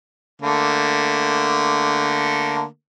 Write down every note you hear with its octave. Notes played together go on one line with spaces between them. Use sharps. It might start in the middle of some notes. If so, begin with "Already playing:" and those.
D3 A3 A#3